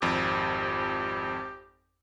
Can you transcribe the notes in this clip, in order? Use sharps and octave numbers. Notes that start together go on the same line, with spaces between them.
G#1 F2 G4